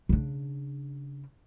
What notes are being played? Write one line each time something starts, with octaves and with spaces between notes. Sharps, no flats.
C#3 D4